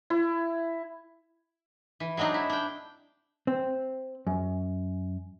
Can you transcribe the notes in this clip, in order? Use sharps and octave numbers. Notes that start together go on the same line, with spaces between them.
E4
E3
F#3 G#3 C4 D4 D#4
E4
D4 G5
C4
F#2